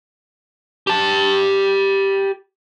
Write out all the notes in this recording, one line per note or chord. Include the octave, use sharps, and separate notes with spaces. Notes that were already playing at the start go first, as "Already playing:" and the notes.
G4 A5